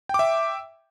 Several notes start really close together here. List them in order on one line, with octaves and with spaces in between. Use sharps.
G5 D6 E5